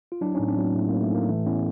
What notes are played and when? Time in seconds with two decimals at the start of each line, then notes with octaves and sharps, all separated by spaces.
0.12 F4
0.21 F#3 D4 E4
0.35 A2 C#4 D#4
0.48 C4 D4
0.57 F#3 A#3
0.75 A2 A3
0.89 F#3 A#3
1.02 A3
1.11 A2 A#3
1.29 E3 A3
1.46 A2 B3 C#4